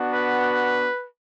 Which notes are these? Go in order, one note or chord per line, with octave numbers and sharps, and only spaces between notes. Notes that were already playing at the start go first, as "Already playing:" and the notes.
Already playing: B3 D4 F#4
B4